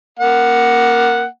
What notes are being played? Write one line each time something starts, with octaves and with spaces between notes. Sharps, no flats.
A#3 F#5